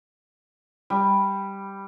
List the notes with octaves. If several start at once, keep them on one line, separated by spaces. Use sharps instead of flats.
G3